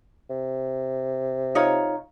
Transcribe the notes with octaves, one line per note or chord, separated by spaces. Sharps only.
C3
D#4 F4 C#5